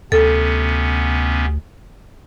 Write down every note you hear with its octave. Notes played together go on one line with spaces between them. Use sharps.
D2 C3 B3 C#4 A4